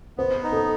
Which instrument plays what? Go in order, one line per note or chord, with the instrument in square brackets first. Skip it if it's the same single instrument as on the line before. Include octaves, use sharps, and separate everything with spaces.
[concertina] B3 [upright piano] C5
[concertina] D#4
[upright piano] A4